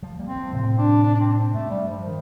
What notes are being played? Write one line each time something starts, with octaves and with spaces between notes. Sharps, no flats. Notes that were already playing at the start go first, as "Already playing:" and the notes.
F3 A3
G3 A#3
C4
F3 A3
A2 C3 C4
D4
D4
D4
C4
G2 A3
G3
F3
D#3